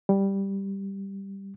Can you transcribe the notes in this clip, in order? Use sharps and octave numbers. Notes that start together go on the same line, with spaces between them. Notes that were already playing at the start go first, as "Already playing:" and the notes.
G3